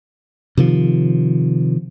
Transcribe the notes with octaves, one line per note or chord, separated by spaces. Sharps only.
C3 D#3 F3